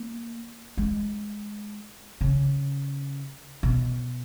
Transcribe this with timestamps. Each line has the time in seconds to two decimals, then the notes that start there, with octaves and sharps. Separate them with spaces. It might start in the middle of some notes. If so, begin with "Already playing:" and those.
Already playing: A#3
0.77 G#3
2.21 C#3
3.63 B2